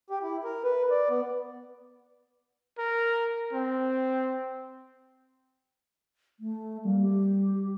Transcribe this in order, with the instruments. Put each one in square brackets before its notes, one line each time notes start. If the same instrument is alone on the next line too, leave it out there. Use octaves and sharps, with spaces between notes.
[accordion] G4
E4
A#4
B4
D5
B3
[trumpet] A#4
C4
[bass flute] A3
[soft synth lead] G3 [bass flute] A#3
[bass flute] G4